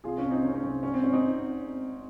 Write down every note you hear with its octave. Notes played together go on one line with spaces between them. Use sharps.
C2 F4 G#4
C#4 F4
C2
C4 D#4
C3 C#4
C#4
C2 C4
G#1 C#4
C4
G#1 C#4
C4 D#4